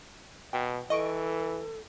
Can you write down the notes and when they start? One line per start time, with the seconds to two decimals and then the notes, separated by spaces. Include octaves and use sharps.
0.53 B2 G5
0.90 E3 A4 D#5 C#6 D7